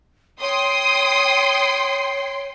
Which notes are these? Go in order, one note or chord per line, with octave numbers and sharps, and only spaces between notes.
C#5 G5 C6 D#6 C7